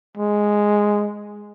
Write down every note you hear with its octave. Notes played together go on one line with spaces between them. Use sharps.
G#3